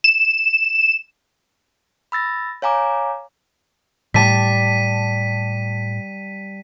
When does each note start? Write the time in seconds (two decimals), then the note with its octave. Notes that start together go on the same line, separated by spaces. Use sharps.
0.04 E7
2.12 B5 E6 A6 A#6
2.62 C#5 F5 G#5 A#5 D6
4.14 A2 G3 A5 B6 D#7